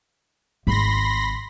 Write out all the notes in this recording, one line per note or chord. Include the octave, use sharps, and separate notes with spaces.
G#1 B5 C6 A#6